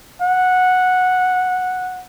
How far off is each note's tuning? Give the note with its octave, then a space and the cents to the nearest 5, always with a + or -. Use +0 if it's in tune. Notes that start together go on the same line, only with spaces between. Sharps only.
F#5 -10